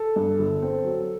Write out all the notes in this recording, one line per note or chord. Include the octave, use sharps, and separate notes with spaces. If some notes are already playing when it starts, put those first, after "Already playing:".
Already playing: A4
G2
G1
C4
F#3